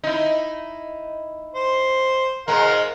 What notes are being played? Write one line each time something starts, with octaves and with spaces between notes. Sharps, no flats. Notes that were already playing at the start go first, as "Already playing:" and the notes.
D#4 E4
C5
G#2 B2 G#3 A#4 F5